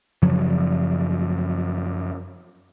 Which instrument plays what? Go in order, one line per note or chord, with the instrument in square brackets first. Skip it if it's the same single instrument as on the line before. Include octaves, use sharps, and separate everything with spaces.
[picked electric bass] F#2 C#3 F3 F#3